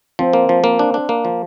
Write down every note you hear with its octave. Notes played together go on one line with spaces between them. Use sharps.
F3 C4
A#3
F3
A#3
D4
D4
A#3
F3